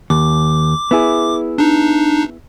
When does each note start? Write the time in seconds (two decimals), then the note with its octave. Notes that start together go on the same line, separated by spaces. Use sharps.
0.10 D#2 D6
0.91 B3 E4 G#4
1.58 D4 D#4